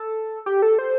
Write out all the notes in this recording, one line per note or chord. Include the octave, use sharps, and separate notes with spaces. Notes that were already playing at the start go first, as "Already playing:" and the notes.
Already playing: A4
G4
A4
C5